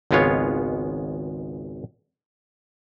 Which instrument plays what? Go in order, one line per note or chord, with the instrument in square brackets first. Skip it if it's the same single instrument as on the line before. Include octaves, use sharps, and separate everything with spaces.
[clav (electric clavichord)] G#1 C#2 G#3 B3 F4 C#5